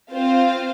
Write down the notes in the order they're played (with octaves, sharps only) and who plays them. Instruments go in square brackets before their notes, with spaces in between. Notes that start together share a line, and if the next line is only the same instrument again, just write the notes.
[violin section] C4 F4 C5 F5